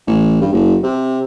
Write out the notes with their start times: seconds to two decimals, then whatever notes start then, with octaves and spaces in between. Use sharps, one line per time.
0.07 A1
0.41 G2
0.53 F#1
0.83 C3